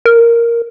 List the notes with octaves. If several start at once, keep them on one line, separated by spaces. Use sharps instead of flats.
A#4